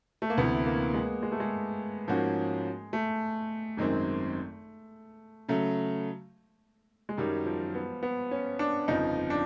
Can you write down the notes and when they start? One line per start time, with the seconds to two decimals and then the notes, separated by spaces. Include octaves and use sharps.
0.22 A3
0.30 A#3
0.37 D2 C3 E3 B3
0.66 A#3
0.94 G#3
1.23 G#3
1.32 A3
1.40 G#3
2.08 G#2 F3 A#3 C#4 F#4
2.93 A3
3.77 G#1 F#2 D#3 G#3 C4
5.48 C#3 F#3 A3
7.09 G#3
7.17 F#2 D#3 F#3 G3
7.46 F3
7.75 B3
8.03 B3
8.31 C#4
8.59 D4
8.88 G1 F2 C#3 F3 D#4
9.30 D4